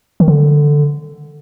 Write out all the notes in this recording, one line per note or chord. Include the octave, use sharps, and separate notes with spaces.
D#3
D3